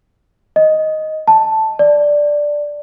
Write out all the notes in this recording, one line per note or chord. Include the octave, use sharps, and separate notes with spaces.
D#5
A5
D5